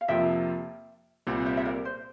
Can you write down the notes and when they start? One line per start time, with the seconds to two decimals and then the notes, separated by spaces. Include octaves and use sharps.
0.01 F5
0.08 F2 C3 F3 A#3 F4 E5 G5
1.27 C2 A#2 G3 C4
1.46 C5 E5
1.57 E5
1.65 A#4 D5
1.85 C5